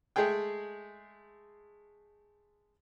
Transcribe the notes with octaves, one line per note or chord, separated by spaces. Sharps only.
G#3 A3 G#4 G5